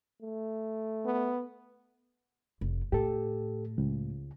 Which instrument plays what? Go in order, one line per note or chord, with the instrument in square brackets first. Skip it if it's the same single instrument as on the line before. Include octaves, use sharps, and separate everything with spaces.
[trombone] A3
[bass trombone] B3
[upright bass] F1
[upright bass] A2 [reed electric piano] G4 A4
[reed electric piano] C#2